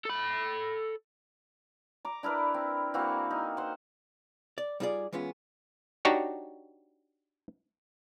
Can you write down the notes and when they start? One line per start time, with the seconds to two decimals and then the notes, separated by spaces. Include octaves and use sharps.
0.05 A4 B5
2.05 A#5 D6
2.23 D4 E4 A#4 B4
2.54 C4
2.94 E3 A#3 C4 F#4
3.31 D#4
3.57 C5 F#5
4.58 D5
4.80 G3 D#4 F4 G#4 D5
5.12 E3 G#3 B3 C#4 F4
6.05 D4 D#4 F#4 G4 C#5